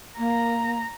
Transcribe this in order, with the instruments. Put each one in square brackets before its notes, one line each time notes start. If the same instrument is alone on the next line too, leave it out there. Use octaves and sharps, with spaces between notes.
[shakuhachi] A#3 [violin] A#5